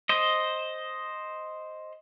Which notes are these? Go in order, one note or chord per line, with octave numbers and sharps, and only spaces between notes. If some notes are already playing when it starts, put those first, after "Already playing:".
C5 D#5